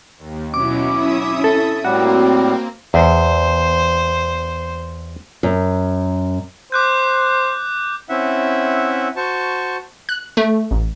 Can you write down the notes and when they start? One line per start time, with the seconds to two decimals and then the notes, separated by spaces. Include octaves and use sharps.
0.18 D#2
0.54 B2 F#3 C#4 E4 D6
0.92 E5 D#6
1.44 A4
1.85 A2 G3 A#3 C4 F#4
2.94 E2 C5
5.43 F#2
6.72 C5 D6 F#6 G6
8.08 C4 C#4 E4 E5 F#5
9.16 F#4 C5 A5 C#6
10.09 F#6
10.37 A3
10.71 A1